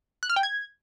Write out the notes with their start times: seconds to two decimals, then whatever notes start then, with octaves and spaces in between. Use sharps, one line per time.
0.23 F#6
0.30 F6
0.36 G5
0.43 G#6